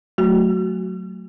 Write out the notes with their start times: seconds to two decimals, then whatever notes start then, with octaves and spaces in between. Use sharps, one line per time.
0.18 F#3 A3 F#4